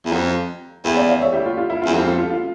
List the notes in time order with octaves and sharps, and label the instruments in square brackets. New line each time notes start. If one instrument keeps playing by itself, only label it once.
[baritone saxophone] E2
[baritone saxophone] F2 [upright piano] G5 A#5
[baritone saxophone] E2 [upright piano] E5 G5
[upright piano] D5 F5
D5 F5
C#5 E5
E4 G4
F4
F4
E4
[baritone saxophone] E2 [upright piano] F4
[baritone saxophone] F2 [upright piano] E4 G4
[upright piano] F4 A4
F4
F4